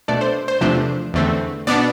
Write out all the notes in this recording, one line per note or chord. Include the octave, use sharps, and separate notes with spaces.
B2 A3 D4 D5
C5
C5
E2 C3 F3 A3 D4 C5
E2 D3 A3 C4
B2 B3 D4 D5